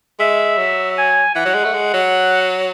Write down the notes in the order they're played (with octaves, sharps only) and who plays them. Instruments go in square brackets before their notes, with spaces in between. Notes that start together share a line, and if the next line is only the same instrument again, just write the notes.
[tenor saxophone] G#3 [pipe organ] E5
[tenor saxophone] F#3
[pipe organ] G#5
[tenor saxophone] E3 [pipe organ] F#5
[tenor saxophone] F#3
G#3
A3
G#3
F#3